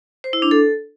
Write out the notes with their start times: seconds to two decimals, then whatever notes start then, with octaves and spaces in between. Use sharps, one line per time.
0.24 C5
0.33 E4
0.42 D4
0.51 A4